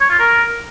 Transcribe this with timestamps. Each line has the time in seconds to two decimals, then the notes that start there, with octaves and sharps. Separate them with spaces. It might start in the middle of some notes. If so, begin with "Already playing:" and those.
0.01 C#5
0.10 F4
0.19 A#4